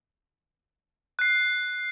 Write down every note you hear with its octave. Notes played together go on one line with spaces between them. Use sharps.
F#6 C7